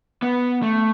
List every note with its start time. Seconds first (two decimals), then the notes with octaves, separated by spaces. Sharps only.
0.22 B3
0.63 A3